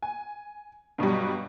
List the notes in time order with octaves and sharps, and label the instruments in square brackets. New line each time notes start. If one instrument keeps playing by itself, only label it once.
[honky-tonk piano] G#5
G2 B2 F#3 G3